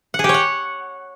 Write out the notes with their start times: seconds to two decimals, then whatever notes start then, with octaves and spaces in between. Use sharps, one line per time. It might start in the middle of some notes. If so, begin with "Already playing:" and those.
0.14 F#5
0.19 G#4
0.24 G4
0.29 C#5
0.34 F#5